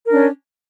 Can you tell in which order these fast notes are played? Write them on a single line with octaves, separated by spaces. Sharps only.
A#4 D4 C#4